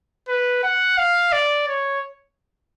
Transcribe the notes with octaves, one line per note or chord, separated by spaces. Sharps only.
B4
F#5
F5
D5
C#5